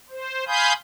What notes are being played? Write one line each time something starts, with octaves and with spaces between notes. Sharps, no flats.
C5
F5 G#5 B5 C6 D#6 G6